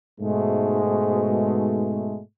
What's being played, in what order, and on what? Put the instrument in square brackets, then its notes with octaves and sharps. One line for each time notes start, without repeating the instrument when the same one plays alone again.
[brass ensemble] G#2 B2 G#3 A3